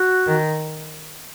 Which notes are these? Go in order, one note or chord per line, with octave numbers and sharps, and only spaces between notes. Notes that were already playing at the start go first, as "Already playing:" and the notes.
Already playing: F#4
D#3